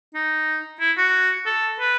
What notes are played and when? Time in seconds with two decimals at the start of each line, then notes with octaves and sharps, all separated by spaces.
0.15 D#4
0.80 E4
0.97 F#4
1.46 A4
1.80 B4